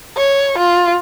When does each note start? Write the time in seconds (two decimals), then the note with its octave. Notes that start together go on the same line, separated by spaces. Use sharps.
0.17 C#5
0.58 F4